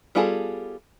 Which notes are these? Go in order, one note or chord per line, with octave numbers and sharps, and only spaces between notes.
G3 B3 F4 G#4 A4